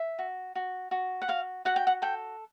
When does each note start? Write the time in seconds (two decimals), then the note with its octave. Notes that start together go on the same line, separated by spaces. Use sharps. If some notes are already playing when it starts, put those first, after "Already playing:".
Already playing: E5
0.19 F#4
0.55 F#4
0.91 F#4
1.22 F#5
1.28 F#4 F5
1.65 F#4 F#5
1.76 G5
1.87 F#5
2.02 A4 G5